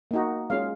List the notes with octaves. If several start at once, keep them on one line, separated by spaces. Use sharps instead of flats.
A#3 D#4 F#4
G#3 C#4 F4 F5